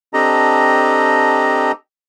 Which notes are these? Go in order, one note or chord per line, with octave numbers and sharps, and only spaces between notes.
C4 D4 G4 A4 D#5 A#5